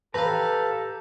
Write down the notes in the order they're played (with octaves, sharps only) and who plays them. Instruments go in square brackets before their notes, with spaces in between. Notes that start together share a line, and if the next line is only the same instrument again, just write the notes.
[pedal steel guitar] G4 A#5 [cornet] A4 [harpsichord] B4 F5